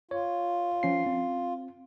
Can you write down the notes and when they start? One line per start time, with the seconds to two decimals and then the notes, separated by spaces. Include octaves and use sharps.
0.11 F4 C#5
0.83 F3 C#4 C7
1.06 C4